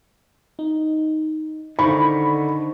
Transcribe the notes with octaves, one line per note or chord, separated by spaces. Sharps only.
D#4
D3 D#3 C5 B5 C#6